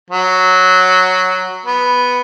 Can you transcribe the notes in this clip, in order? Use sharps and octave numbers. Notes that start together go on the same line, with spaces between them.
F#3
B3